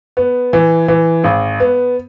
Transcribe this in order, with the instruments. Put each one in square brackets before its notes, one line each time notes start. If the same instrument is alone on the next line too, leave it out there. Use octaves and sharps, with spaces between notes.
[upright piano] B3
E3
E3
G#1
B3